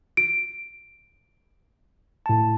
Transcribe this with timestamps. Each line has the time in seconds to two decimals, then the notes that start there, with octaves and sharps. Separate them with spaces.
0.17 D7
2.26 A2 A5